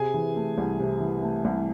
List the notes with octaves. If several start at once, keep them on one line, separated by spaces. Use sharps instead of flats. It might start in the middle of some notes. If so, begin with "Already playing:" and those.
Already playing: C3 G#4 G#5
E3
A3
C2
C3
E3
A3
C2